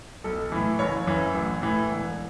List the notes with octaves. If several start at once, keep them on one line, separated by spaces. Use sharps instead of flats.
B1 A4
A2 E3
F#1 C#5
F#2 E3
A1
A2 E3
E1